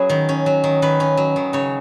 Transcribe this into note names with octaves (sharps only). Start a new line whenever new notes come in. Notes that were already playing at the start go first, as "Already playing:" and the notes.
Already playing: F#3 C#4 G#4 B4
D#3
C#4
F#3
D#3
D#3 B4
C#4
F#3
D#3
C#3 C#5